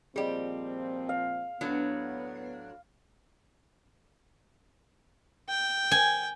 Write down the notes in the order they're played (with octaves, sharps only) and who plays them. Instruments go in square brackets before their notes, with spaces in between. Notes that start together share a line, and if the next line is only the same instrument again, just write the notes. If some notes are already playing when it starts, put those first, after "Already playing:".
[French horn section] A#2 F3 C4 [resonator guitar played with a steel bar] G3 G4 [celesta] G#4 D5 D#5
[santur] F5
[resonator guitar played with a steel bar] A2 F#3 D4 [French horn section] B3
[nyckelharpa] G5
[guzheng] G#5